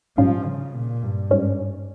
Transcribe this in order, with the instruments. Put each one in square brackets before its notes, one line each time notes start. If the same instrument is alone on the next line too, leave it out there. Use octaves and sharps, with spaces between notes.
[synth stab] A#1 G#2 G3 C#4 F4 [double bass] F3
[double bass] C#3
A#2
G2
[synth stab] G#2 G3 C#4